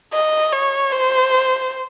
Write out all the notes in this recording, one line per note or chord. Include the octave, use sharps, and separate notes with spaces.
D#5
C#5
C5